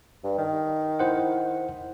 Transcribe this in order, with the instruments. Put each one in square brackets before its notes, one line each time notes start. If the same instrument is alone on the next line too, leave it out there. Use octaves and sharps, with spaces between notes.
[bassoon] G2
D#3
[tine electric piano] E4 C5 F#5